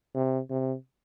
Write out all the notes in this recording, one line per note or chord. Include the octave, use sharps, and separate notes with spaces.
C3
C3